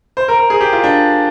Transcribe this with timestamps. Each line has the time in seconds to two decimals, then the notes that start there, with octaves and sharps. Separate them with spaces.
0.17 C5
0.28 A#4
0.39 A#4
0.50 G#4
0.61 G4
0.73 F4
0.84 D4